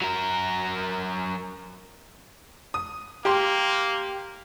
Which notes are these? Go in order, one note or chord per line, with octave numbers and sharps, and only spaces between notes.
F#3 A#4
D#6
A#3 G4 C6